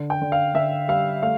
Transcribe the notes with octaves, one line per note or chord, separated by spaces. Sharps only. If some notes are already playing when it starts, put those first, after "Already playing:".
Already playing: D3
G5
D3
F5
D3 E5
G3 F5
A3 F5